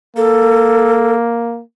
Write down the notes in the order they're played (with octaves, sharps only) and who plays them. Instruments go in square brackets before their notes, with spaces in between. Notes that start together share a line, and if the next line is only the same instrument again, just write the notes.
[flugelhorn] A#3 [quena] A4